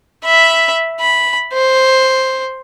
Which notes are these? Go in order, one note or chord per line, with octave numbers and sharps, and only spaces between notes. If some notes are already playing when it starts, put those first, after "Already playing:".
E5 B5
B5
C5